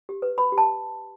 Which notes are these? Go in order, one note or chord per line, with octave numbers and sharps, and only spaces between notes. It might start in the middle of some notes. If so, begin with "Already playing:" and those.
G4
B4
B4 B5
G4
A5